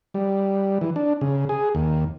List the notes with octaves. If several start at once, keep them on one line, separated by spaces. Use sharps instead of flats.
G3
E3
D4
C#3
G#4
D#2